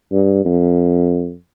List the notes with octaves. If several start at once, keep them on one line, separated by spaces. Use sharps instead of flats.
G2
F2